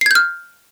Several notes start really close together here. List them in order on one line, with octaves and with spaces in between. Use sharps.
C7 G#6 G6 F6